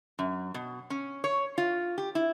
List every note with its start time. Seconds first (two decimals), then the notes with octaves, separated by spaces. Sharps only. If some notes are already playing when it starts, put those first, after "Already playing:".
0.19 F#2
0.54 B2
0.90 C#4
1.24 C#5
1.58 F4
1.98 G4
2.15 E4